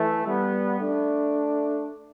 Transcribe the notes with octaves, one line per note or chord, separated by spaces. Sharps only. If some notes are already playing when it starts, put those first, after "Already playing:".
Already playing: E3 A3
G3 B3
A3 D4